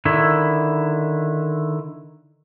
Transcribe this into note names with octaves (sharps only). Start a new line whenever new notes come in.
D3 D#3 E4